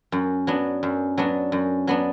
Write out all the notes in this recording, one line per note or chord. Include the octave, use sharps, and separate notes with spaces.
F#2
F#3 B3 D4
F#2
F#3 B3 D4
F#2
F#3 B3 D4